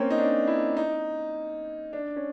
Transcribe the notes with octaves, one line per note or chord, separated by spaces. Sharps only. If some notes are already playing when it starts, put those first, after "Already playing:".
Already playing: A#3 C4 C#4
D#4
D4
E4
D#4
D4
C#4